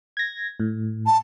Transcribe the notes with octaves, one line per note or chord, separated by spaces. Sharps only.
G#6 A#6
A2
A5